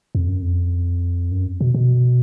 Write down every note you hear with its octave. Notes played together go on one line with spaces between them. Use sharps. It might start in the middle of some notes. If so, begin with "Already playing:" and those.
F2
F#2
F2
F#2
B2
B2